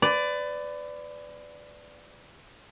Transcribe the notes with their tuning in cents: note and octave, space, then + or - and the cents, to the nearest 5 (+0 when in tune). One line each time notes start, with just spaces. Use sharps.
B4 +30 D5 +0